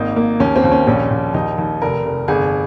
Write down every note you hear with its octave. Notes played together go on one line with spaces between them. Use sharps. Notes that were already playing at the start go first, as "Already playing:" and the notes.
Already playing: G#1 A#3 D#4
A#3
D#2 C#4
C4
D#2
C#4
A#1 C#4
A#1
D#2 D#4
D#2
F1 A#4
F1
G1 G#4